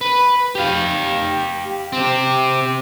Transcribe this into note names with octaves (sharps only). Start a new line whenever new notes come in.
B4
G4 F5
C4 G4